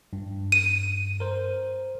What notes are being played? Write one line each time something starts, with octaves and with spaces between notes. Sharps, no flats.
G2
D#7
A#4 C5